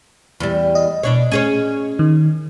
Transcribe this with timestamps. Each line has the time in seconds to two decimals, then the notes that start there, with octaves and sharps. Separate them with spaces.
0.40 E2 G3
0.75 D#5
1.03 B2 D4 C#5
1.32 C#4 G#4 C#5
1.99 D#3